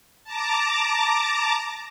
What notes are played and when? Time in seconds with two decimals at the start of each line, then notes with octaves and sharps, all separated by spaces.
0.24 A5 A#5 D6